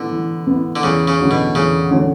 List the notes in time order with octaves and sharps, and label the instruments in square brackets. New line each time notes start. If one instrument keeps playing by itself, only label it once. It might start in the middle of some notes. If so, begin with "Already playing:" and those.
Already playing: [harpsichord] D3 [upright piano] E3 B3 E4
[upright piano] E3
B3 E4
[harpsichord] D3
[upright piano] E2 [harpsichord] C#3
[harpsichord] C#3
[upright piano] D3 F#3 C#4
[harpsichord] B2
[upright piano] E2 [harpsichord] C#3
[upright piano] D3 F#3 C#4